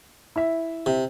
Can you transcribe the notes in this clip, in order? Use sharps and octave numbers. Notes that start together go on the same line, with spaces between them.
E4 E5
C3